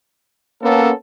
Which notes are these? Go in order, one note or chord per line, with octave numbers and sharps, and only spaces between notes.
A#3 B3 C#4 A4